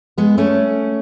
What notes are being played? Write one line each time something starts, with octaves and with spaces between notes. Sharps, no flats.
G#3 B3
A3 C#4